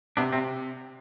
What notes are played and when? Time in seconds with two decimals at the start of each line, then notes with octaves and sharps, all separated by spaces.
0.17 C3 B3 D4
0.32 C3 C4